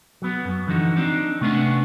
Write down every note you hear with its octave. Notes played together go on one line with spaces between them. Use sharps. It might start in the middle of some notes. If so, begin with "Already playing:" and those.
F#3 B3
F#2
D3 E3 F3 D#4 F#4
C4 D4 D#4
C3 A3 B3 C#4 D4